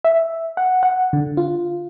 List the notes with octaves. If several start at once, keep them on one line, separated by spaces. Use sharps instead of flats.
E5
F#5
F#5
D3
F4